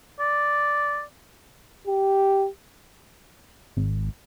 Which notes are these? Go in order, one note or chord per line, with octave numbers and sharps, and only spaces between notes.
D5
G4
G#1